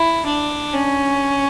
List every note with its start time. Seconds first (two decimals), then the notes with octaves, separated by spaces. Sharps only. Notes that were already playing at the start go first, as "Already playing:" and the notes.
Already playing: E4
0.26 D4
0.74 C#4